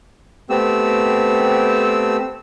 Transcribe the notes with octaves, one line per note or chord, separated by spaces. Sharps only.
A3 B3 C4 G4 E6